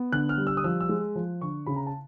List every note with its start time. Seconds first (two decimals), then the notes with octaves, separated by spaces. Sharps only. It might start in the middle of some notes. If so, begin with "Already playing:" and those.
Already playing: B3
0.12 D3 F#6
0.29 F6
0.38 G3
0.47 E6
0.57 D#6
0.64 F3 E6
0.80 E6
0.89 G#3
1.16 F3
1.41 D3 C#6
1.66 C#3 B5
1.76 A#5
1.87 A5